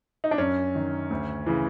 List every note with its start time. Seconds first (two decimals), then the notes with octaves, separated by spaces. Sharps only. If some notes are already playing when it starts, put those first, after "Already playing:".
0.24 D#4
0.31 D4
0.38 F#2 C#4
0.75 D#3
1.10 D2
1.46 C#3 E3